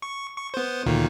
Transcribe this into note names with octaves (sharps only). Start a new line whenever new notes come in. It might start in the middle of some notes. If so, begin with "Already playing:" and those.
C#6
C#6
B3 C5
D2 A#2 D#3